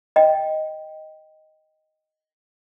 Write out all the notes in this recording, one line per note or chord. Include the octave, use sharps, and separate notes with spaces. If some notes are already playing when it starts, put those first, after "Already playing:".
D#5 G5